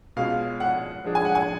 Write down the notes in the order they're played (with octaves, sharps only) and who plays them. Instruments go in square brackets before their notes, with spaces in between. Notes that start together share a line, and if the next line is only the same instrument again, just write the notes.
[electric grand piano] B2 G#3 C#4 F4 [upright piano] F5
[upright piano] F#5
[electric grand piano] F3 G#3 D4 G#4
[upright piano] G#5
F#5
G#5